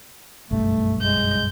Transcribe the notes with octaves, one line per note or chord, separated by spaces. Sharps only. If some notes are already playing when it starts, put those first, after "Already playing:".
F#1 B1 G2 A3
G#3 G6